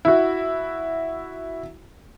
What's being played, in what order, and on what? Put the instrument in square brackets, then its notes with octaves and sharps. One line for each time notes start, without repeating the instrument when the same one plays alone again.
[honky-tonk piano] E4 F#4